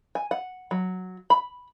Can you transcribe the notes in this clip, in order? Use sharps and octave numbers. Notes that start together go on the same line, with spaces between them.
G#5
F#5
F#3
B5